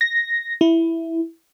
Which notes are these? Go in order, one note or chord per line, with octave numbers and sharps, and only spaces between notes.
A#6
E4